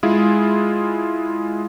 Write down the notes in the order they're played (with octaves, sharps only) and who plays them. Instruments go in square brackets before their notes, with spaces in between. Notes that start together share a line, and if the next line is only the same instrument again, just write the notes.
[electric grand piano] G#3 E4 F4 G#4